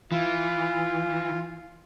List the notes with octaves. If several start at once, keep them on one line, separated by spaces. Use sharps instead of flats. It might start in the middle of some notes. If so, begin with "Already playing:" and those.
E3 F4